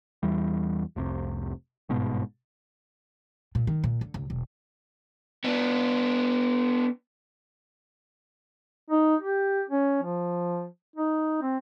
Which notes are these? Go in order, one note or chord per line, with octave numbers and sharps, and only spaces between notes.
E2 E3 G3
F1 C2 C3
G1 G#2 B2
A#2
D#3
A#2
D3
C#2
E1
B3 D4
D#4
G4
C#4
F3
D#4
C4